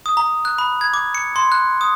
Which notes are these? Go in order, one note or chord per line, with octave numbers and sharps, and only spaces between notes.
D#6
A#5
F#6
B5
G#6
D6
C#7
C6
F#6
D#6